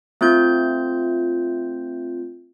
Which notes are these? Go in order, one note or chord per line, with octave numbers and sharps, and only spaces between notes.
A3 C4 F4 G6